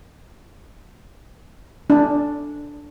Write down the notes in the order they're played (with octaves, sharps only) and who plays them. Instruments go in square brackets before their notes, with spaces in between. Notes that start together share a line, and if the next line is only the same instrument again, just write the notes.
[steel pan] D4